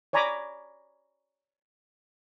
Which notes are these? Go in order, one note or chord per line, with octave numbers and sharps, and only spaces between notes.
C#5 D5 G#5 A#5 B5 D6